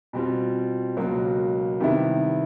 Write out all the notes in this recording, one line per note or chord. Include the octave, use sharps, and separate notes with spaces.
B2 G3 C4 F4
C#2 B2 F#3 A#3
C3 D#3 G3 B3 E4